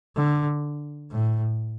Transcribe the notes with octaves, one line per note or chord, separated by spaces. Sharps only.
D3
A2